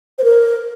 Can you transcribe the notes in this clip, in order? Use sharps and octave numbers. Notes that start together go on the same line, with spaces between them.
C5
A#4